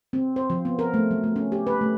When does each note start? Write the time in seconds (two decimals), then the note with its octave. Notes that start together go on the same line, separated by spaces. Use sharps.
0.13 C4
0.36 C5
0.50 F3
0.65 B3
0.79 A#4
0.94 A3
1.11 F#3
1.24 A3
1.36 C#4
1.52 G4
1.67 B4
1.81 A3